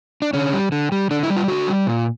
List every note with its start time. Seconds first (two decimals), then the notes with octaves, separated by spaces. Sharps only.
0.22 D4
0.33 D3 C#4
0.53 G3
0.72 D3
0.92 G3
1.11 D3 D4
1.23 E4
1.30 G3
1.37 F4
1.48 D3 F#4
1.68 G3
1.87 A#2